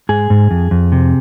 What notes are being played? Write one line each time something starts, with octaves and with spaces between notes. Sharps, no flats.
G#2 G#4
G#2
F2
F2
C3